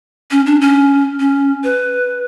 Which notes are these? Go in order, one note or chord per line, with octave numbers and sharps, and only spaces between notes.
C#4
D4
C#4
C#4
B4